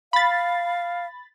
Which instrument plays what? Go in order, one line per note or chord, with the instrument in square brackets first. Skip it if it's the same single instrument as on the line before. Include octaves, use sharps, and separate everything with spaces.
[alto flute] F5 [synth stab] B5 A6